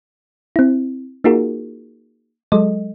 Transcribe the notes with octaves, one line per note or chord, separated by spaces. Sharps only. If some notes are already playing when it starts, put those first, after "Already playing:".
C4 E4
A#3 D#4 F4 F#4 G#4 A#4
F#3 G#3 A4 D#5